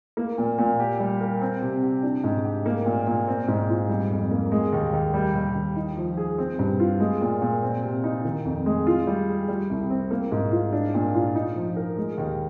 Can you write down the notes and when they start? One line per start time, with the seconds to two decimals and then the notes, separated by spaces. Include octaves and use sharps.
0.17 A#3
0.38 A#2
0.58 A#2
0.80 G4
1.00 G3
1.21 A#4
1.41 C4
1.62 C3
1.83 G4
2.03 D4
2.24 G#2
2.44 G4
2.66 A#3
2.86 A#2
3.07 A#2
3.28 C4
3.48 G#2
3.69 F4
3.89 G3
4.11 F2
4.31 A#3
4.52 G#3
4.72 D#2
4.93 D#2
5.14 G3
5.35 D#2
5.55 D#2
5.76 D#4
5.97 F3
6.17 G#4
6.38 C4
6.59 G2
6.80 F4
7.00 G#3
7.21 A#2
7.42 A#2
7.63 C4
7.83 C3
8.04 D#4
8.25 D#3
8.45 F2
8.66 G#3
8.87 F4
9.07 G3
9.28 G#4
9.48 G3
9.69 C2
9.90 C4
10.11 A#3
10.32 G#2
10.52 F4
10.73 D4
10.94 A#2
11.15 F4
11.35 D#4
11.56 F3
11.76 A#4
11.97 G#3
12.18 D#2